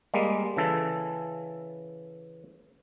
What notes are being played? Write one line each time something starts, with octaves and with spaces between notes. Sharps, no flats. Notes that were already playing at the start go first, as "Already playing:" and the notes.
G3 G#3 A#3
C#3 E3 A4